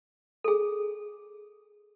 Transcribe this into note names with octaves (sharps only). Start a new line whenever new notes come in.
G#4 A4